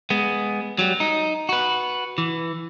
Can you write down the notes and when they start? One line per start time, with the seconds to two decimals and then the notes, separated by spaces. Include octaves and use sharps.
0.10 G#3 B3
0.79 F#3 G3
1.00 D#4
1.49 F#4 B4
2.18 E3